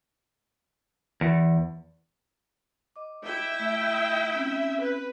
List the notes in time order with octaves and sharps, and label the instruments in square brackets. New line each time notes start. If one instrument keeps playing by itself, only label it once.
[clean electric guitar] E2
[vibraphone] D#5 D6
[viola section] E4 E5 G5
[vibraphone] A3 E6
C4 C#4
[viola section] B4